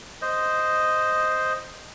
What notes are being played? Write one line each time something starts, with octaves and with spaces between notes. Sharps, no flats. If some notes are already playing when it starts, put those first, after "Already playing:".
C5 D#5